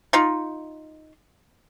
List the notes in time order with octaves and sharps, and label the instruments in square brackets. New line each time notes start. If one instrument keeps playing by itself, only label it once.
[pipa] D#4 F4